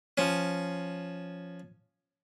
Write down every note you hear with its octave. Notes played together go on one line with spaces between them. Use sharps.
F3 C#4